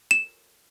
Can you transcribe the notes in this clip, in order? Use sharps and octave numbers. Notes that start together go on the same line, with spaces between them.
E7